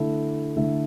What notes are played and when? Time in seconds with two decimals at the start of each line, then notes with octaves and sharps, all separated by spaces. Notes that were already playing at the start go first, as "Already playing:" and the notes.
Already playing: D3 A3 E4 A4 E5
0.56 D3 A3 E4 A4 E5